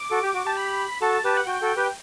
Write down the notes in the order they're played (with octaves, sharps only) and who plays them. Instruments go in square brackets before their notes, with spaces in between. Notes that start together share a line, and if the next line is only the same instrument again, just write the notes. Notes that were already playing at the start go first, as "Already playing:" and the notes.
Already playing: [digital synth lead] D6
[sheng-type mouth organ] F#4 A4
G4
F#4
[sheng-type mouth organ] G4 [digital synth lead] A5
[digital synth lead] B5
[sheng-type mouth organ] F#4 A4 [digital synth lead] A5
[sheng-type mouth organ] G4 B4
[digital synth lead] F#5
[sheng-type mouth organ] F#4 [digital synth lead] G5
[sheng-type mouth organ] F#4 A4
G4 B4